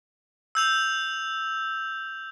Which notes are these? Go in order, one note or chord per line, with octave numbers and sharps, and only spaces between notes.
E6 G6 F7